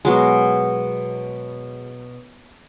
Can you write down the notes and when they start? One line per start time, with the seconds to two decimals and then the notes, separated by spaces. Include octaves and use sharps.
0.05 B2 F#3 G#3